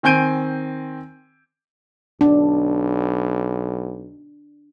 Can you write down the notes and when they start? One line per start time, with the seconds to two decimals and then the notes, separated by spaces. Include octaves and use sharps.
0.03 D#3 C4 G#5 G6 D7 D#7
2.21 B1 D4